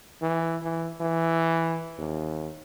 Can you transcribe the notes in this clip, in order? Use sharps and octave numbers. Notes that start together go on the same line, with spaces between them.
E3
E3
E3
D#2